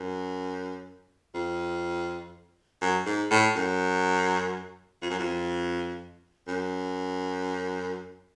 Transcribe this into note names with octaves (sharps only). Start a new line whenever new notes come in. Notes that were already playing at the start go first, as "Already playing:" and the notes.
Already playing: F#2
F2
F#2
G#2
A2
F#2
F2
F#2
F2
F#2